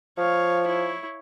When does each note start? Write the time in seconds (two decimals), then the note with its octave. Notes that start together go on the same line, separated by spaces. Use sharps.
0.18 F3 C#5 F5
0.66 E4 C#5